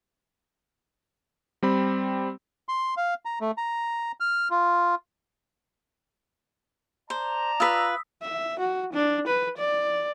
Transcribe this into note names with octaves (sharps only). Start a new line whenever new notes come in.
G3 C4 B5
C6
F5
A#5
A3
A#5
F6
F4
C5 D5 A5 A#5
F4 B4 D#6 E6 B6
E5
F#4
D4
B4
D5